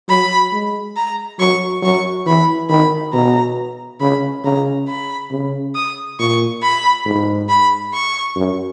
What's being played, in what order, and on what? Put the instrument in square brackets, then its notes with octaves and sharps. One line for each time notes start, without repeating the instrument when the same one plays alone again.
[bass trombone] F#3 [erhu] B5
[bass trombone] G#3
[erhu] A#5
[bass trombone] F#3 [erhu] C#6
[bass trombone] F#3 [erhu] C#6
[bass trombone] E3 [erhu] B5
[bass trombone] D#3 [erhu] B5
[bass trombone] B2 [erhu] A#5
[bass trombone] C#3 [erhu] B5
[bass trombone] C#3 [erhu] A#5
[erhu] B5
[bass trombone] C#3
[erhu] D#6
[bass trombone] A#2 [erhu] C#6
[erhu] B5
[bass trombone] G#2
[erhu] B5
C#6
[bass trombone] F#2